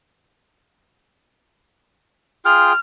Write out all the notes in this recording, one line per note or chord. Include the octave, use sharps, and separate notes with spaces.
F4 G#4 G5 F6